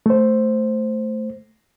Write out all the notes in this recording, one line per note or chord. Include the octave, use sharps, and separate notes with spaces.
A3 C5